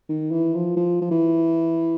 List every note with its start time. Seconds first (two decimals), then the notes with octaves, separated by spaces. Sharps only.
0.09 D#3
0.32 E3
0.54 F3
0.77 F3
1.01 F3
1.11 E3